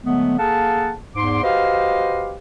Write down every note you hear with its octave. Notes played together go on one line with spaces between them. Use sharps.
D3 F#3 G#3 A3 B3
A#3 G#4 A4 F5 F#5 A5
E2 G#2 C6 D6
F#4 G4 B4 C5 D#5 F5